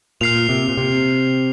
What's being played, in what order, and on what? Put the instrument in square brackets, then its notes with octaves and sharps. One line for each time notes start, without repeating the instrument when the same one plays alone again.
[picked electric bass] A#2 [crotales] F6 C7 F7
[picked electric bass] C3
A#2
C3